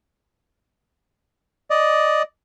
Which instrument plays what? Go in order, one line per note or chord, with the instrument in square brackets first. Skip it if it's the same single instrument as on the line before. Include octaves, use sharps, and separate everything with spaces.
[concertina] D5 D#5